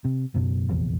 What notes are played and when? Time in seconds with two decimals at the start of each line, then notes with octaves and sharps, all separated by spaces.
0.05 C3
0.34 F#1 F#2 B2 F#3
0.69 F1 A#1 E2